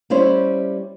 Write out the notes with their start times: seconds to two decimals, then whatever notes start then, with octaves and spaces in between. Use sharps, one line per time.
0.10 G3 C#4 E4 C5